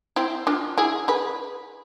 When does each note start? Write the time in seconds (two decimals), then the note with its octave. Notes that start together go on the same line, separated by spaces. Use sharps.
0.16 C4 E4
0.47 D4 F4
0.78 E4 G#4
1.08 G#4 B4